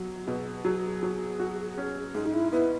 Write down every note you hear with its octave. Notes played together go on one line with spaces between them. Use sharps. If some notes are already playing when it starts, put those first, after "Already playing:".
Already playing: B2 F#3
F#4
B2 G#4
F#3 G#4
F#4
G#4
F#3
F#4
C#4
G#2 G#4
D#4
E4
B3 E4